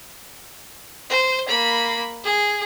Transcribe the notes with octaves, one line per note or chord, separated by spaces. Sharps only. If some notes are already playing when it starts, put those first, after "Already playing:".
C5
A#3 B5
G#4